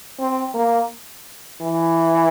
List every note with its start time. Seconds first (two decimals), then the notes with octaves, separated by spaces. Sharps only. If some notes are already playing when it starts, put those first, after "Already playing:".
0.19 C4
0.54 A#3
1.61 E3